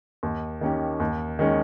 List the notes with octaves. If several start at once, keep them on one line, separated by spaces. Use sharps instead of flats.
D#2
D#3 A#3 C#4 G4
D#2
D#3 G#3 C#4